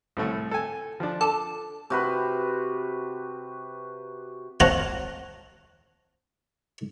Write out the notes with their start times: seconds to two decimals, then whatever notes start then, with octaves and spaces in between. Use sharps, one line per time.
0.17 C2 A2 A3
0.51 A4 G#5
1.00 F3 D4
1.21 A4 D6
1.90 C3 F#4 B4
4.60 C4 F4 C#5 F#5 A5 A#5